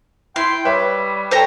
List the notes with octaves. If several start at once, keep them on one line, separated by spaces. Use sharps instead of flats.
E4 G5 C6
G3 B4 C#5 E5
A4 C5 C#5 G5 A#5